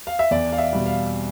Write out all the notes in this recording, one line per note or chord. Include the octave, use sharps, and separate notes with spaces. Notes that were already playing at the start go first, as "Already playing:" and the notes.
F5
E5
E2 D5
F5
E5
B2 G3
F5